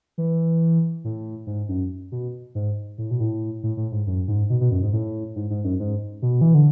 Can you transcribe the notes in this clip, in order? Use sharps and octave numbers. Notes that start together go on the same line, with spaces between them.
E3
A2
G#2
F#2
B2
G#2
A2
B2
A2
A2
A2
G#2
F#2
G#2
B2
B2
F#2
G#2
A2
G#2
G#2
F#2
G#2
B2
E3
D3